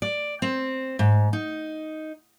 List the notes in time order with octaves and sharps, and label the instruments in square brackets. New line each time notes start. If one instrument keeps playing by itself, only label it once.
[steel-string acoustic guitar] D5
C4
G#2
D#4